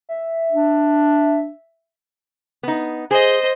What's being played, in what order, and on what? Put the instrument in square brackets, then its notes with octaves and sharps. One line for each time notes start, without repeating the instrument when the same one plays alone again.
[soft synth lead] E5
[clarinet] D4
[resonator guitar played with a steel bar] B3 D#4
[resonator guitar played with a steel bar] G#4 [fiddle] C5 D#5